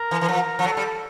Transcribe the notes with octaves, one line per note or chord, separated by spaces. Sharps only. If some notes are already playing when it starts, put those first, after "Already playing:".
Already playing: A#4
E3
E3
F3
F3
F#3 A4
G3